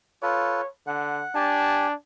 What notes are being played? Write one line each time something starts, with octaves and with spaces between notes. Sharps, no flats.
F4 A4 B4 C#5
D3 F#5
D4 G4 G#5 A5